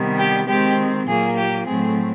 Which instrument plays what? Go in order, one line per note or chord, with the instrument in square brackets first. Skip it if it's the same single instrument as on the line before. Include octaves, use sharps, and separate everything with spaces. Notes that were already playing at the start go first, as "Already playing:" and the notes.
Already playing: [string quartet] C3 D#3 G3 B3
G4
D#3 G#3 C4 G4
A#2 F#3 A#3 G#4
G4
A2 F#3 A3 C4 G#4